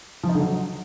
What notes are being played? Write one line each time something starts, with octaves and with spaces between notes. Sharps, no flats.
F3
D#4
D3
F#3